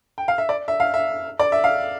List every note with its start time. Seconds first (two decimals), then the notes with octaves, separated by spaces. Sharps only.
0.18 G5
0.28 F5
0.38 E5
0.49 D5
0.68 E5
0.80 F5
0.94 E5
1.39 D5
1.52 E5
1.64 F5